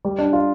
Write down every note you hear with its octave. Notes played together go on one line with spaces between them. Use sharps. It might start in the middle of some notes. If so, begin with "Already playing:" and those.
G3
D4
F4